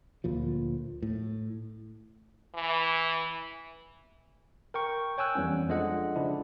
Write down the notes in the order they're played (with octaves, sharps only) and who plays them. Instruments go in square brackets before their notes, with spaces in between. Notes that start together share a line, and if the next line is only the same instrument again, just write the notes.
[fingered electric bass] D2 A#2 F3
A2
[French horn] E3
[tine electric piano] A#4 G5 C#6
C#5 G5 G#5 E6 F#6
F2 E3 G3 B3 C#4
F3 G#3 D4 A4 D#5 F#5
C#3 F3 D4 E4